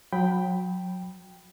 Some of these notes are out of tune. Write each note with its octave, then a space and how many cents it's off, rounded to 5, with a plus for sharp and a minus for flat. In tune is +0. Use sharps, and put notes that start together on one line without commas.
F#3 -25 G5 +0 B5 +0